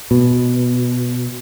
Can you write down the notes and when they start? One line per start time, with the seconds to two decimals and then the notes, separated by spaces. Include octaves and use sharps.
0.11 B2